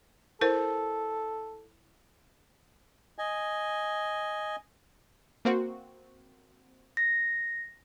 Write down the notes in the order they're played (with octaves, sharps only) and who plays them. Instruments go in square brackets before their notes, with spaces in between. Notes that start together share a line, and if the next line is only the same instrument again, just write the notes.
[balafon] E4 A#4 C5 [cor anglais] A4
[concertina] D#5 G#5
[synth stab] A#3 C4 F#4
[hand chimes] A#6